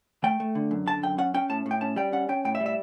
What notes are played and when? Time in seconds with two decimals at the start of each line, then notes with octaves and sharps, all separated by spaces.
0.24 A3 G5
0.40 A3
0.55 D3
0.71 F#2
0.87 D3 A5
1.03 F#2 G5
1.18 C#4 F#5
1.34 C#4 G5
1.49 A2 A5
1.66 A2
1.71 G5
1.81 C#4 A5
1.96 G3 G5
2.12 C#4 F#5
2.29 C#4 G5
2.45 A2 G5
2.55 E5
2.60 G3
2.66 E5